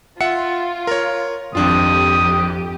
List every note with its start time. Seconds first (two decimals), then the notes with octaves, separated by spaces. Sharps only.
0.21 F4 E5 F#5 C#7
0.87 A#4 C#5
1.55 G#1 F2 D4 F4 G4 D#6